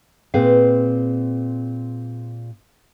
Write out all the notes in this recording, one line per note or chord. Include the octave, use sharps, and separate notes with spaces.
A#2 C4 G#4 B4 F5